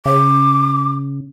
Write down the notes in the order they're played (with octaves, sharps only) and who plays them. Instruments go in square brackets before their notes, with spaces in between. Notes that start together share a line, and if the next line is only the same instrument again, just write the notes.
[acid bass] C#3 [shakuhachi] D6